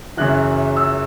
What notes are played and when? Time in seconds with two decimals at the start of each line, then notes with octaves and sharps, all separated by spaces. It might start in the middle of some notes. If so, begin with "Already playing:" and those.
0.17 F#1 F#2 C#3 E3 F#6
0.77 E6